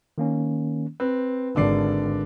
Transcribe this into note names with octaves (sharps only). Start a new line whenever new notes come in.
D#3 A#3 C#4
C4 B4
G#1 D3 D5 C7